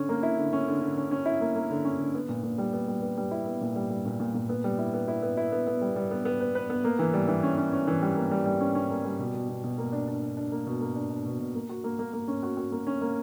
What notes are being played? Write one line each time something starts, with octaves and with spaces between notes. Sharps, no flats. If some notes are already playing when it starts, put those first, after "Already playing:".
Already playing: D3 C#4
A#3
E4
D3
C#4
D3
D3
C#4
C#4
E4
A#3
A#3
D3
C#4
D3
B3
A#2
A#2
G3
B3
G3
B3
G3
E4
B3
A#2
G3
G3
A#2
A#2
A#2
B3
G3
E4
B3
E4
B3
E4
B3
B3
G3
G3
B3
B3
B4
B4
B3
A#3
E3
G3
E3
C#4
C#4
C#4
E3
G3
A#3
G3
G3
C#4
C#4
A#3
G3
B2
B2
B2
B2
A#3
D4
D4
D4
D4
A#3
B2
A#3
D4
D4
B2
B2
A#3
F#4
A#3
A#3
A#3
C#4
F#4
F#4
A#3
C#4
A#3